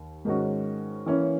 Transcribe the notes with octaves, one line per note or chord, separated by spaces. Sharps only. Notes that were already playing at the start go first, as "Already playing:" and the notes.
Already playing: D#2
G#2 D#3 G#3 C#4 F#4
E3 A#3 C#4